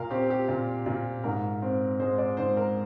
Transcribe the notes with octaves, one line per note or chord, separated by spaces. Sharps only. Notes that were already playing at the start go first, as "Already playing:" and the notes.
Already playing: A#2 A#4 F5
C4 G4
G4
A#2
A#2
G#2 A#4
C4
G#3 C5
D5
G#2 C5
A#4